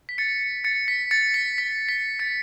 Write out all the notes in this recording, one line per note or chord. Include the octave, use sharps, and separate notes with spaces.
B6
A6 C#7
A6 C#7
B6
A6 C#7
B6
B6
B6
A6 C#7